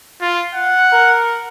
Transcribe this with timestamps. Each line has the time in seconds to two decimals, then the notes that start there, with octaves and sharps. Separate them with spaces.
0.21 F4
0.54 F#5
0.93 A#4